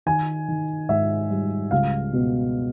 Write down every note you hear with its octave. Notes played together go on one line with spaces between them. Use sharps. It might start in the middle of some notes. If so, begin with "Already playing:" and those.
D#3 G#5
D#3
G#2 E5
G3
C#2 F5
B2